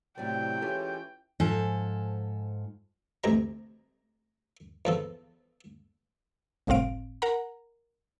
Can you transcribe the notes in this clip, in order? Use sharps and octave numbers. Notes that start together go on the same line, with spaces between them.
A2 C3 F#3 D5 G5
E3 G#3 C#4 F4 G4 A4
G#2 F3 A4 G#5
A1 D2 C3 A#5
E2 F3 A4
G1 C2 A2 C4 F5 D7
A#4 F#5 A#5